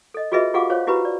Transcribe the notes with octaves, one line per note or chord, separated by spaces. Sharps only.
A4 D#5
F4 F#4 G#4 B4 D#5 E5
F4 G4 G#4 F5 F#5 D6
F4 C5 C#5 F5
E4 F#4 G4 B4 A#5 B5
D5